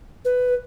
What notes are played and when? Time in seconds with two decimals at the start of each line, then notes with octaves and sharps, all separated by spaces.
0.25 B4